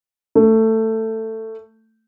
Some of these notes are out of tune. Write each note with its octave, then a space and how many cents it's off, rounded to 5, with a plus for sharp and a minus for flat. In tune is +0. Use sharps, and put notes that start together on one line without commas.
A3 +15